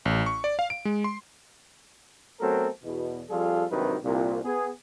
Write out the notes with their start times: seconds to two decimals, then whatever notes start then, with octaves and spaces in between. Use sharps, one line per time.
0.05 A1
0.26 C#6
0.44 D5
0.59 F5
0.70 D7
0.85 G#3
1.04 C6
2.40 F#3 A3 B3 C4 A4 A#4
2.83 E2 B2
3.29 F2 F3 G3 F4 G#4 A4
3.71 G#1 G2 C3 D#3 F#3 B4
4.03 C2 A#2
4.44 B3 G#4